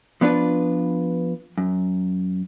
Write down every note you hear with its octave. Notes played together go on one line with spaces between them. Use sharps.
F3 B3 D4 F4 B4
F#2